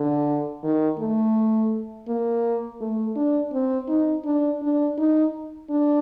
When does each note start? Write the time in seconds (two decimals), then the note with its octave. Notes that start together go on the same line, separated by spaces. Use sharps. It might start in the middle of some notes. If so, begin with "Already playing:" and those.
Already playing: D3
0.64 D#3
0.99 A3
2.08 A#3
2.81 A3
3.16 D4
3.53 C4
3.89 D#4
4.25 D4
4.62 D4
4.98 D#4
5.70 D4